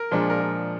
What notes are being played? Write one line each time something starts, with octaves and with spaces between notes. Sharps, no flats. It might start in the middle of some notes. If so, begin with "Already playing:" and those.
Already playing: A#4
A#2 F3 G#3 D4
A#4
G#4